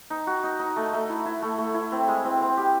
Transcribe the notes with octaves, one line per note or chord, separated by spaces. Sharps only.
D#4
F#4
D#4
D#4
A3
A3
E4
E4
A3
A3
E4
C4
G#3
C4
C4
G4